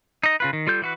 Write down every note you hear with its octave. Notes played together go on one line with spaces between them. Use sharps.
D#4 D#5
C#3 F4 B4
D#3
G3 F4 A4 G6
E3 F#4 B4